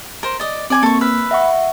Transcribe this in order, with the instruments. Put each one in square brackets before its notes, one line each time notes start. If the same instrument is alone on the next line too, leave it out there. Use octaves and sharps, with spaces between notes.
[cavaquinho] A#4 C5
D5 D#5
[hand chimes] C4 [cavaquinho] D5 G#5 D6
[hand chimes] A#3 [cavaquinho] A4 C#6
[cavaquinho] B4 [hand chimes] E6 F6 B6
[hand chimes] E5 F#5 C#6